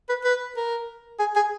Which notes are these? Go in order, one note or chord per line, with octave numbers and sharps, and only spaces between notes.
B4
B4
A#4
G#4
G#4